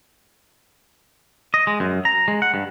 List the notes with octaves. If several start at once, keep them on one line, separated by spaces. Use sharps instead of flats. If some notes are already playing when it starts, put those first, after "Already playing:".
D#5
G#3
F#2
A#5
G#3
F#5
G2